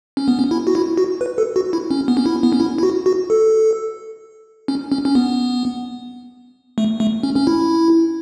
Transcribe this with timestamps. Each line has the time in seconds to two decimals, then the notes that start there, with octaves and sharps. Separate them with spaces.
0.17 C#4
0.28 B3
0.39 C#4
0.51 E4
0.67 F#4
0.75 E4
0.97 F#4
1.21 B4
1.38 A4
1.56 F#4
1.73 E4
1.91 C#4
2.08 B3
2.17 C#4
2.26 E4
2.43 B3
2.53 C#4
2.60 E4
2.78 E4
2.83 F#4
3.06 F#4
3.30 A4
4.68 C#4
4.92 C#4
5.05 C#4
5.15 B3
6.78 A3
7.00 A3
7.23 C#4
7.36 C#4
7.47 E4